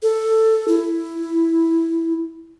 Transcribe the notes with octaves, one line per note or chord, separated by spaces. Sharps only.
A4
E4